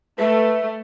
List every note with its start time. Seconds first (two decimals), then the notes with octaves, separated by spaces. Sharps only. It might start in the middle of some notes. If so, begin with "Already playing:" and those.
0.19 A3 B4 E5